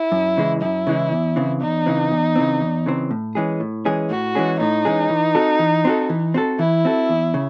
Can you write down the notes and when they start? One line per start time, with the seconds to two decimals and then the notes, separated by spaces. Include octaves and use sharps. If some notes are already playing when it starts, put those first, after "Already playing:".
Already playing: E4
0.12 F#2
0.37 C#3 E3 G#3
0.62 F#2 E4
0.87 C#3 E3 G#3
1.12 E2
1.36 C#3 E3 C4
1.61 E2 D#4
1.86 C#3 E3 C4
2.12 E2
2.36 C#3 E3 C4
2.61 E2
2.86 C#3 E3 C4
3.11 A2
3.35 E3 G#3 C#4 G#4
3.60 A2
3.85 E3 G#3 C#4 G#4
4.10 A2 F#4
4.35 E3 G#3 C#4 G#4
4.60 A2 D#4
4.85 E3 G#3 C#4 G#4
5.10 E3
5.35 C4 F#4 A4
5.59 E3
5.85 C4 F#4 A4
6.10 E3
6.34 C4 F#4 A4
6.59 E3 E4
6.85 C4 F#4 A4
7.09 E2
7.34 C#3